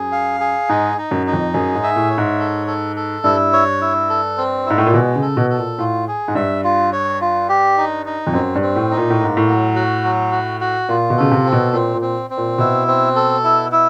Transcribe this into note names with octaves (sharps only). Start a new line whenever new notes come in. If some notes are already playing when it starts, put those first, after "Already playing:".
Already playing: F#2 G#4
F5
G#4
G#2 D#4
D#4
F#2
D#4
F2
F#2 G#4
G#2
E5
A2
C#5
G#2
A4
A4
A4
G2 E4
C#5
E4
A4
C4
G#2 E4
A2
A#2
B2 G#3
C#3
A4
B2
A4
A#2
A2 F4
G#4
G#2
G2 E5
F4
C#5
F4
G4
D#4
D#4
F2
F#2 C4
G2
C4
A2
D#4
A#2
A2
A#3
G#2
A2
F#3
F#4
F#3
F#4
F#4
A#2 F4
B2
C#3 A4
C3
C4
B2
A#2 C4
A#2
C4
C4
A#2
B2 E4
C4
A4
E4
E4